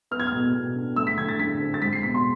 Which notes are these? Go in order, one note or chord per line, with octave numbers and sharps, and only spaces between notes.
B3 F6
G#6
F6
B2
B2
D4
A3 E6
B6
D3 G#6
A6
D3 B6
C4
A6
G#3 B6
C7
B2 B6
C6